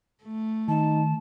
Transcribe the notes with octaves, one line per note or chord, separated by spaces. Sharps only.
A3
D#3 D#4 A5